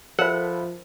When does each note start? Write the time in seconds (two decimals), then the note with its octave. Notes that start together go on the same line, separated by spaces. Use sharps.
0.19 F3 A4 A#4 C5 E5 F#5 B5